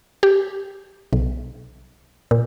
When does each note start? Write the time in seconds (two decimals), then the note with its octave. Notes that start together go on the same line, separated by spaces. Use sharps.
0.23 G4
1.13 B1
2.31 A#2